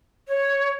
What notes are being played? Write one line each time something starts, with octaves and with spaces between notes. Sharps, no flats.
C#5